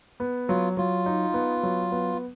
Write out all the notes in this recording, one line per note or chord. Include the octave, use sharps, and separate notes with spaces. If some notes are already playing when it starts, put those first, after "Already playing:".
B3
F#3 F4
F#3 F4
D#4
B3
F#3
B3